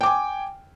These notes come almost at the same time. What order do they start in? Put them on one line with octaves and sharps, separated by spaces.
G5 D6 G#5